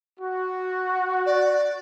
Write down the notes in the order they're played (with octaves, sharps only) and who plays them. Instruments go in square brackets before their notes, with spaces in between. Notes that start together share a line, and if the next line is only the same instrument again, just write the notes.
[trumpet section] F#4
[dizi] D5